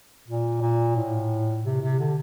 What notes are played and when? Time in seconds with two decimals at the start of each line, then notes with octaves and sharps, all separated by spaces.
0.28 A#2
0.61 A#2
0.96 A2
1.65 C3
1.82 C3
1.99 D3